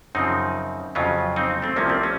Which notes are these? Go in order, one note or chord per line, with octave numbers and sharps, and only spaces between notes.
F#2 C#3 F3 C4 D#4
F2 C#3 F#3 C#4 F4
C4 D#4
A3 C4
C2 C3 F3 A#3 C#4
A3 C4
C#4